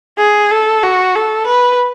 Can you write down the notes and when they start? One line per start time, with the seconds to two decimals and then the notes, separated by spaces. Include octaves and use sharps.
0.18 G#4
0.51 A4
0.83 F#4
1.15 A4
1.46 B4